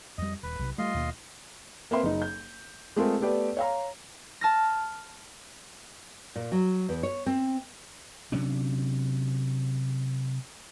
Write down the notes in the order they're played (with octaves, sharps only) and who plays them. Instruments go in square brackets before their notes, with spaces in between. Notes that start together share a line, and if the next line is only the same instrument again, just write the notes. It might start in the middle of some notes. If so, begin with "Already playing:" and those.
[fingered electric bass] F2 G3 [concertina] D#5
[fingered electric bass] D#1 [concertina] B4
[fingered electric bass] B1 C3
[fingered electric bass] G3 A3 [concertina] F4 D#5 C6
[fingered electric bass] D#2 B2 A#3
[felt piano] A#3 C4 B4 E5 C6
F#1 D#4
G6
G#3 A3 C4 F4 G#4 A#4
A3 B3 G4 B4 D5
C#5 F5 A#5
[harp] A5 F6 A#6
[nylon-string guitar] A#2
F#3
E2
C#5
C4
[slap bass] C3 F#3 C#4 D4